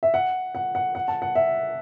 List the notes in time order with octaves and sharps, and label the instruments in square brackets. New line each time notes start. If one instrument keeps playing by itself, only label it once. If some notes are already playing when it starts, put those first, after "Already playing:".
[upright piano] E5
F#5
F#5
F#5
F#5
A5
F#5
E5